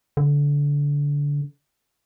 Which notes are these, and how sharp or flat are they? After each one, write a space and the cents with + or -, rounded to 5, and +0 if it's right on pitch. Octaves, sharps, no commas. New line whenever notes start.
D3 -25